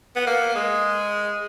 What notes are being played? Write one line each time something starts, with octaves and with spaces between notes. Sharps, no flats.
B3
A#3
G#3